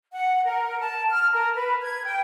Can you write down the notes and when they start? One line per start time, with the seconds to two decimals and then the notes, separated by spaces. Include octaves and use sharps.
0.13 F#5
0.45 A#4
0.79 A5
1.11 F6
1.32 A#4
1.56 B4
1.82 G#6
2.05 G5